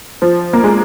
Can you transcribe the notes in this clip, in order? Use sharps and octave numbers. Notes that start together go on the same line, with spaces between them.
F3
A#3
G#3